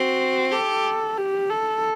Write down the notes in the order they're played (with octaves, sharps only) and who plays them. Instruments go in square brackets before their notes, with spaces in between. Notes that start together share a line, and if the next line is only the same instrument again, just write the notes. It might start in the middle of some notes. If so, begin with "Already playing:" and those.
Already playing: [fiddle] C4 [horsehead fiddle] F#4
[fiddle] G4 [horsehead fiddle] A4
[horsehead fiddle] G4
A4